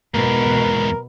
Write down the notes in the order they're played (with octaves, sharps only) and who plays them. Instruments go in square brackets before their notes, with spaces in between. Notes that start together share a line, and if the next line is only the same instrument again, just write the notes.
[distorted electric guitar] E2 G#2 [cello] B2 [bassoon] A#4